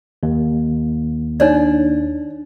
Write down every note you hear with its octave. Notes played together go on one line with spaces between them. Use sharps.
D#2
D4 D#4 C#5 D5